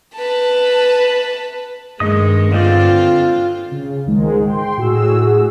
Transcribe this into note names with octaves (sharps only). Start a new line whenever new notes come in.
B4 A5
G2 D#3 G#3 D#5 D#6
D3 C4 F4 D5
C#3
C#2 G#2 D#3 G#3
G5 C6
A2 F#4 G#4 E6